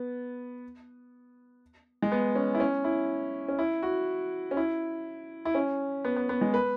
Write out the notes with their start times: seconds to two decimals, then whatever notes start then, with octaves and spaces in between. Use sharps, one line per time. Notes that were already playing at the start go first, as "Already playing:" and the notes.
Already playing: B3
2.02 G#3
2.12 B3
2.35 C#4
2.54 E4
2.60 C#4
2.84 E4
3.48 C#4
3.59 E4
3.83 F#4
4.51 C#4
4.57 E4
5.45 E4
5.55 C#4
6.05 B3
6.16 B3
6.29 B3
6.41 G#3
6.54 B4